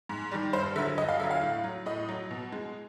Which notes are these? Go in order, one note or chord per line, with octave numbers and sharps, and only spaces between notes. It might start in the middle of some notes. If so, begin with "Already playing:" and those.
G#2
D#3 G3
G2 C5
D3 F#3 E5
G2 D#5
F5
D3 F#3 E5
F5
A2
F#3
A2 D#5
F#3
B2
G#3